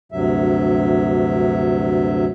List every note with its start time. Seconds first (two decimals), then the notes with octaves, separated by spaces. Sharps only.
0.12 D2 G2 C3 F#3 E5